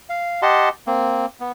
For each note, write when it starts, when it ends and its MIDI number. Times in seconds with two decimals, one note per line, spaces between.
0.09 0.41 77
0.42 0.69 67
0.42 0.69 75
0.42 0.69 78
0.42 0.69 81
0.42 0.69 84
0.87 1.26 58
0.87 1.26 60
1.40 1.52 59